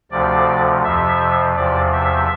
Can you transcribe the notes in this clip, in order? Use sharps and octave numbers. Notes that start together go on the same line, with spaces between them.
D2 C3 F3 D5
F2 C3 F3 E5
E2 C3 F3 D5
E5